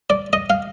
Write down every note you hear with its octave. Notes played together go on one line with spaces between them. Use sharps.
D5
D#5
F5